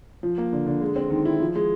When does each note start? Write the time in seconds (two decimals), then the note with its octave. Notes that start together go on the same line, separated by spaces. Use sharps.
0.23 F3
0.38 A#3
0.53 D3
0.67 D3
0.81 G#3
0.96 C4
1.10 D#3
1.25 E4
1.41 F3
1.56 G#3